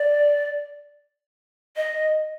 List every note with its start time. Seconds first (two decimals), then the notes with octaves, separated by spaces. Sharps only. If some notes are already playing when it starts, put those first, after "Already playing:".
Already playing: D5
1.77 D#5